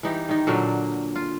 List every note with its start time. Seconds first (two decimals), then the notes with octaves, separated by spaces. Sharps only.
0.03 E3 D#4 G4
0.29 D#3 D#4
0.47 A#2 D3 F#3 A#3
1.15 F4